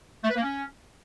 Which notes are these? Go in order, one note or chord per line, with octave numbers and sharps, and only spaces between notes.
A3
B4
A#3
C#4